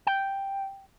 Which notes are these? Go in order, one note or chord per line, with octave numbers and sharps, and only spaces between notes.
G5